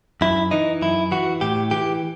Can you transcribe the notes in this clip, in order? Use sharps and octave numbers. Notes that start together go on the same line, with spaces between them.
F#2 E4
E3 D#4
F#2 E4
E3 F#4
A2 G4
E3 G4